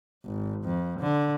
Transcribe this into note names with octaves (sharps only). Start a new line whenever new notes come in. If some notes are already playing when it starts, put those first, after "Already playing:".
G#1
F2
D3